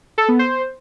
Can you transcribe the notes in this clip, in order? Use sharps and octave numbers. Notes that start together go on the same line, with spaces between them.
A4
B3
C5